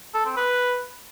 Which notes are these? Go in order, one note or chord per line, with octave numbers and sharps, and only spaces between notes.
A4
C4
B4